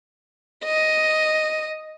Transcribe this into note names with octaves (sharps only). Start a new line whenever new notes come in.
D#5